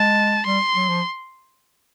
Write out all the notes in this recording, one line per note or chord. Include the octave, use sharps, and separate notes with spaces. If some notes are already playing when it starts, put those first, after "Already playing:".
Already playing: G#3 A5
G3 C6
F#3
F3